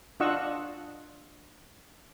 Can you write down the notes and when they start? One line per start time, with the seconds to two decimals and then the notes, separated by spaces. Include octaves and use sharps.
0.20 D4 F4 D#5 F#5 C#6 E6